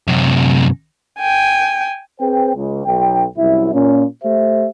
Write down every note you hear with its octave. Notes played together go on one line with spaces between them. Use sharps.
F#2 C3
G5 G#5
C4 G#4 B4 C5 G5
C#2
B1 G5
C2 F#2 E4 E5
A#2 C#4
A3 G4 C5 E5